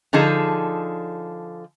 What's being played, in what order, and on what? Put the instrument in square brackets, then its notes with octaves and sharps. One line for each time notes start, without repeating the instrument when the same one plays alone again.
[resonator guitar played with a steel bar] D3 F3 D#4 G#4 A4